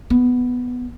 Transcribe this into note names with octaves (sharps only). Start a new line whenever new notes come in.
B3